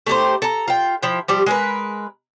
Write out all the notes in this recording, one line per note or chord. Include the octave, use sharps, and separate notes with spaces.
A3 D#4 G4 C5
A4 A#5
F4 G5
F3 E4 G5
F3 G3 G4
G#3 A#4 B4